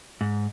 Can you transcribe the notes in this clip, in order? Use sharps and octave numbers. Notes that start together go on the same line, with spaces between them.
G#2